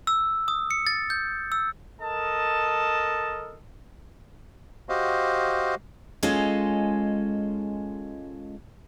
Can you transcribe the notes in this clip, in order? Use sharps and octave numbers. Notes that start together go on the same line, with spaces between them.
E6
D#6
C#7
A6
G6
E6
A4 A#4 D#5 A5
F#4 G4 C5 D#5 F5
G#3 C#4 F4 A4 D#5